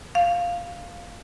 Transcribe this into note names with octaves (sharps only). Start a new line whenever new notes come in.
F5